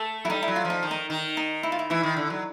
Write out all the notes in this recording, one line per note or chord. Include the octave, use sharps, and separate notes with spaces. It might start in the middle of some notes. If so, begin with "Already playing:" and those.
Already playing: A3 A4
F#3 E4
G3 D#4
E4
F#3
F4
F3
D#4
D#3
D#4
D#3
D#4
E4
F4
E4
E3 E4
D#3
D3
F#3